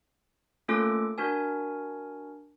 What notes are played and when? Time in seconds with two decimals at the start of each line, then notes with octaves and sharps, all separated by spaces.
0.68 A3 A#3 C#4 F4 A4 D6
1.18 D4 F#4 A#4 G#5